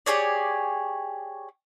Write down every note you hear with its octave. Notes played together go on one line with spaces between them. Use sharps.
G4 G#4 C#5 D5